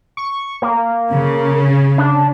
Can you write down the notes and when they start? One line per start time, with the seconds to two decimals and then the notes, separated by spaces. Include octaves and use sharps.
0.17 C#6
0.62 A#3
1.11 C#3
1.98 D4